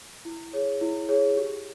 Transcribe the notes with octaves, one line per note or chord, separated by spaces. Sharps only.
E4
G#4 C#5
E4
G#4 C#5
G4